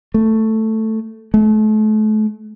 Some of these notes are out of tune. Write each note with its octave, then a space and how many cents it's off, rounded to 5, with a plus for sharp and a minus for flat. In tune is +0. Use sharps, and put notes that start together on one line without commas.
A3 +5
A3 -35